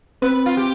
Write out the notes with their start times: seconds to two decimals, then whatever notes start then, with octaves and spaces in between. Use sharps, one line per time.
0.22 C4 B4
0.46 F4
0.57 G4